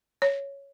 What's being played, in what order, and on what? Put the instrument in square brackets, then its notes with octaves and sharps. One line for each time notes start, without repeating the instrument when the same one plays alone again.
[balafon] C#5